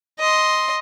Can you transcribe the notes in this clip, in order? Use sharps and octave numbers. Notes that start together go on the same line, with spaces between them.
D#5 C6